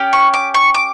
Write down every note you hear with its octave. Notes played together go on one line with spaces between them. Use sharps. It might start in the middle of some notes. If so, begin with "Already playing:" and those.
Already playing: C#4 G4
C#6
D6
C#6
D6